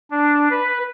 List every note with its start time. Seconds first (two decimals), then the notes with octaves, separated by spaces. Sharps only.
0.11 D4
0.50 B4